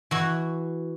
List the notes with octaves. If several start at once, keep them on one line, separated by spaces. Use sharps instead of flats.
E3 F#4